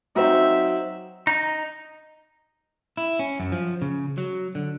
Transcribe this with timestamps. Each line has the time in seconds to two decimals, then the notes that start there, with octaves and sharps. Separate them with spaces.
0.16 F#3 C4 D#4 E5
1.27 D#4
2.97 E4
3.19 C#4
3.40 F#2
3.52 F3
3.82 C#3
4.18 F#3
4.55 D3